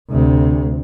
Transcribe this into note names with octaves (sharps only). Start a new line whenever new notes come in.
D2 C3